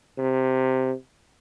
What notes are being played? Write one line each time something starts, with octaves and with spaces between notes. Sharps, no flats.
C3